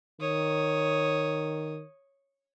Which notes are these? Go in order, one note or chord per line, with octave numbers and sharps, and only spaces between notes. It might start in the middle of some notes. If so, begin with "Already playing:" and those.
D#3 C#5 D#6